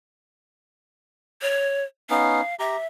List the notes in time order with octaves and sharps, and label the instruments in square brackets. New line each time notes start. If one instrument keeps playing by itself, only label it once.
[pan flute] C#5
[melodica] B3 C#4 D#4 [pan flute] F5
[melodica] G4 A#5 [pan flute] E5